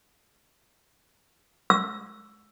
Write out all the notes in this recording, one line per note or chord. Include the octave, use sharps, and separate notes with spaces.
E6